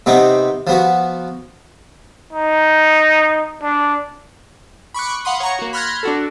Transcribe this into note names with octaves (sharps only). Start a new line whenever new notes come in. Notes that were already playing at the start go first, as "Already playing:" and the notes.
C3 B3 C4 D#4
F3 B3 F#4
D#4
D4
B5 C#6 D6 F#6
F5 F#5 B5 C6 D#6
C#5 F#5 A#5 C#6
A#3 F#4
B5 C6 F6 F#6 G#6 A#6
D4 F#4 A4